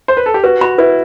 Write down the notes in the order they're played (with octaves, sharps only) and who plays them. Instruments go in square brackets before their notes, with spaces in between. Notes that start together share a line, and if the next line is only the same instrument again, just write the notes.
[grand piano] C5
B4
A4
G4
[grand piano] F#4 [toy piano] B4
[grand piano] F#4 [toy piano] B5
[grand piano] E4 [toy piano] B4